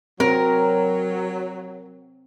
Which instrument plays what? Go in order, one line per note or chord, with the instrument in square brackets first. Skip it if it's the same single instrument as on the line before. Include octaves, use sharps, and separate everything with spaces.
[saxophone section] F#3 [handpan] C4 [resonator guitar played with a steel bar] A#4